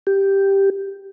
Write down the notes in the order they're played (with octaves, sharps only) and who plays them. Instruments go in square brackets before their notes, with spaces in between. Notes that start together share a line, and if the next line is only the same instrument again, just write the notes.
[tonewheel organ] G4